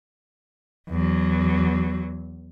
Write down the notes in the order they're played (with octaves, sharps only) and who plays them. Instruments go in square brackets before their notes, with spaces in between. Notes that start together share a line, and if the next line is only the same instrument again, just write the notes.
[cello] E2 F#3